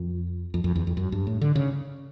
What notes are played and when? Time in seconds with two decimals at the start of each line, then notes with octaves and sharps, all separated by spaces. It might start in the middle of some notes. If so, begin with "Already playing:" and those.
Already playing: F2
0.54 F2
0.64 F2
0.76 E2
0.87 F2
0.97 F#2
1.12 G2
1.27 A2
1.41 D3
1.55 C#3